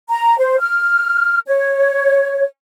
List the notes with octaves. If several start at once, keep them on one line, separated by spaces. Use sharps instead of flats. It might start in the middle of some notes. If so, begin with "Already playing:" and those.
A#5
C5
F6
C#5